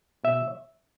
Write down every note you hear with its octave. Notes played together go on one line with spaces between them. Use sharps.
B2 E5